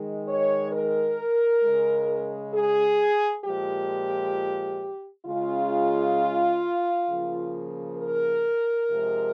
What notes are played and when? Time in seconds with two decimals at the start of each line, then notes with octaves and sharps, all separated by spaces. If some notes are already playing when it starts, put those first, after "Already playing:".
Already playing: D#3 G#3
0.28 C#5
0.73 A#4
1.63 C#3 G#3
2.55 G#4
3.44 A#2 F3 G#3 G4
5.26 C#3 G#3 F4
7.07 C#3 F3 A#3
7.98 A#4
8.89 C3 F3 G#3